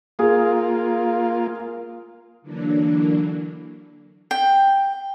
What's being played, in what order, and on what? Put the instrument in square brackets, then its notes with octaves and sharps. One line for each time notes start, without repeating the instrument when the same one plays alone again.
[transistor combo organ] A#3 F4 [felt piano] G#4
[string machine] D3 E3 F#3 A#3 D4
[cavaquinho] G5